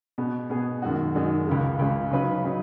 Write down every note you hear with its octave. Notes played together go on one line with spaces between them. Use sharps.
B2 B3 G#4
B2 B3 G#4
F#2 D#3 G#3 D#4 F#4
F#2 D#3 G#3 D#4 F#4
C#2 C#3 G#3
C#2 C#3 G#3
C#3 F#3 D#4 B4
C#3 F#3 D#4